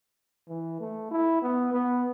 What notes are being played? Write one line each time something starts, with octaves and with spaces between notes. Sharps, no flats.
E3
A3
E4
B3
B3